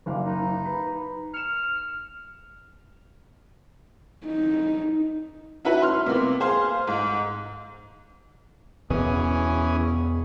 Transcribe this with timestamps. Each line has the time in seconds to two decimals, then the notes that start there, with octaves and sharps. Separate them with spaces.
0.06 F#1 F5 D6
0.25 D#4
0.65 B4 B5
1.34 F6 C#7 E7
4.26 D#4
5.65 C#4 E4 F#4 B4
5.82 C6 F6
6.06 C3 A#3 B3
6.40 G#4 C5 F5 C6
6.87 G#2
8.90 E2 B2 E3 B3 C#4 G#4